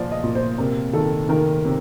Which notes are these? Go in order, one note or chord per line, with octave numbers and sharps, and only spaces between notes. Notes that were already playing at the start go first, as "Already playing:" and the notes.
Already playing: A#2 F3 D5
D#5
A#2
C5
C3 A#4
D#3 A4
D#3 A#4
C3